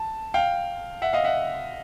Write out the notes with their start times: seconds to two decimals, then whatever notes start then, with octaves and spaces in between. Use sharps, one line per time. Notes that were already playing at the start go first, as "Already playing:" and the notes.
Already playing: A5
0.34 F5 G5
1.02 E5 F#5
1.13 D#5 F5
1.24 E5 F#5